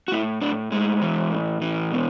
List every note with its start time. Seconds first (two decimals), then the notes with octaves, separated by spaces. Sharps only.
0.08 F#4
0.12 A2 E4
0.42 A2 D4
0.71 A2 G#3
1.02 E3
1.31 A2
1.61 E3
1.91 B2